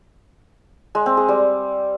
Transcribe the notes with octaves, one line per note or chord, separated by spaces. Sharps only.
G#3
C4
G#4
G3